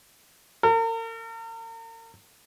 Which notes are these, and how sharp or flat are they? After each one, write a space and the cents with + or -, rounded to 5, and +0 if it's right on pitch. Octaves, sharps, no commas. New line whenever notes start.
A#4 -40